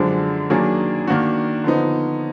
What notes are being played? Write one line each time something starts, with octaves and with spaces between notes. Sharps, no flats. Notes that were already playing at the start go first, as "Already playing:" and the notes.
Already playing: F#2 D3 F3 G#3 D4
D#3 F#3 A#3 D4 G#4
D#3 A#3 D4 F#4
D3 F3 B3 D#4